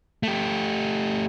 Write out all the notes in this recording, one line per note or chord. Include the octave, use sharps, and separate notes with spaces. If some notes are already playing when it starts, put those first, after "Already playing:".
A3 G4